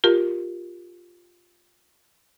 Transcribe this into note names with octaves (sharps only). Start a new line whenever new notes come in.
F4 G4 A#4